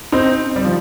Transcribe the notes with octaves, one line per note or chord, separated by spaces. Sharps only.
C4 D#4
G3
F3